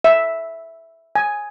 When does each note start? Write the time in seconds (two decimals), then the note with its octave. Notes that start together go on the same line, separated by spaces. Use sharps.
0.04 E5
1.16 G#5